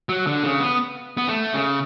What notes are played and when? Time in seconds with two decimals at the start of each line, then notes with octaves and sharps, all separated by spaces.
0.09 F#3
0.27 D3
0.44 C#3
0.60 B3
1.17 B3
1.28 A3
1.53 C#3